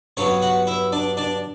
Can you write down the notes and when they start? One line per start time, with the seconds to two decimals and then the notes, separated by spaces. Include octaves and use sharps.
0.17 G2 F#3 B3 C#4 C#5
0.42 F#4 F#5
0.67 E4 E5
0.92 D4 D5
1.17 D4 D5